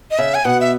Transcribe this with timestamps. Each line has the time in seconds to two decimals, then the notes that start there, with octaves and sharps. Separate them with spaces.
0.11 D#5
0.18 C#3 E5
0.34 G#5
0.45 B2 F#5
0.61 E5